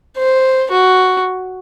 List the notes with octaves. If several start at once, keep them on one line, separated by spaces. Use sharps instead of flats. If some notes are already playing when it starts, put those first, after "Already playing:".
C5
F#4